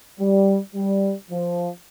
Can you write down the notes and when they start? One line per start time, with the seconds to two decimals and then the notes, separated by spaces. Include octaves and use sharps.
0.19 G3
0.74 G3
1.30 F3